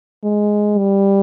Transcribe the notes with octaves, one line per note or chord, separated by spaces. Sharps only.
G#3
G3